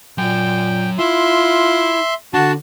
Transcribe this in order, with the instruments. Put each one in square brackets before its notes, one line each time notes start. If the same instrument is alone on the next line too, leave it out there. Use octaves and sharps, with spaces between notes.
[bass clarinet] A#2 [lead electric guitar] F#3 G#5 [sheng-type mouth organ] G5
[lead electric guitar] E4 [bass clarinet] F4 [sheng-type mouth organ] E5 C6
[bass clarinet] D3 [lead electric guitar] D4 [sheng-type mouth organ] F#4 A5